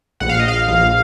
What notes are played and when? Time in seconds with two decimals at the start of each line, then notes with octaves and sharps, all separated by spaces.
0.20 A#1 F#5
0.29 F5
0.40 D#5
0.48 F5
0.68 A#1